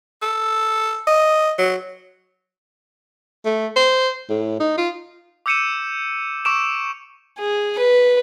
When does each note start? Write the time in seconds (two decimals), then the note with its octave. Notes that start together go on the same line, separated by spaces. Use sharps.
0.22 A4
1.07 D#5
1.59 F#3
3.45 A3
3.76 C5
4.30 A2
4.60 D#4
4.78 F4
5.46 D6 E6 G6 C#7 D#7 E7
6.45 C#6 D6 E6 D7 E7
7.39 G#4
7.78 B4